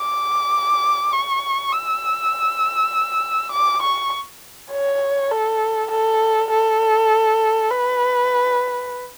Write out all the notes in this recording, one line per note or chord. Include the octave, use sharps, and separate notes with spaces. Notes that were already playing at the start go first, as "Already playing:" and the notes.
Already playing: D6
C#6
E6
D6
C#6
C#5
A4
A4
A4
B4